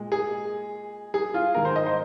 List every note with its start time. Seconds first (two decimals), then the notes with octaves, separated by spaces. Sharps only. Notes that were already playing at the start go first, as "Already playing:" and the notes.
Already playing: A#2 G#3
0.12 G#4
1.14 G#4
1.34 F4
1.54 G#2 D#3 A#3 A#4
1.65 C5
1.76 D#5
1.86 C5